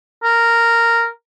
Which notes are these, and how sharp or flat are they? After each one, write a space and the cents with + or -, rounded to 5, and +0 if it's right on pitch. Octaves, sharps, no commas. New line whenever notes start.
A#4 -10